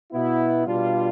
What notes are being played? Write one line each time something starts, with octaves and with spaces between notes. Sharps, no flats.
B2 B3 E4
B2 G3 D4 F4